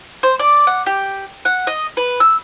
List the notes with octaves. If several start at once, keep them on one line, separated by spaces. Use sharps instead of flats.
C5
D5
F#5
G4
F#5
D#5
B4
E6